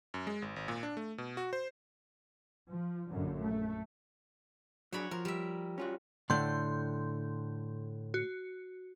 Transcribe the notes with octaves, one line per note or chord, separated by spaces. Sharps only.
F#2
G#3
G#1
G#1
A#2
D4
A3
B2
F#4
C5
F3
A#1 F#2 D3
A3
F#3 D4 F#4 G#4 C#5 B5
F3 A#4
G3 E5
C#4 F4 F#4
A2 D3 C6 G6
F#4